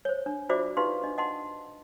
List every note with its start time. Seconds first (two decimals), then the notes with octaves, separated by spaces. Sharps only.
0.05 C5 C#5
0.26 D4
0.49 F4 F#4 C5 D5 E5 D6
0.77 D#4 F4 G4 B4 F5 C6
1.04 D4 D#5
1.18 D#5 F#5 A5 C6